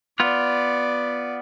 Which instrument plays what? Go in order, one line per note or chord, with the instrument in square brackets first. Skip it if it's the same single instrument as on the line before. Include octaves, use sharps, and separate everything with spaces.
[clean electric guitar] B3 F4 [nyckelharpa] D5